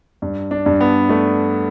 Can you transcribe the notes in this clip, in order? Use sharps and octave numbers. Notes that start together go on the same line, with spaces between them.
G2
D4
G2
B3
A3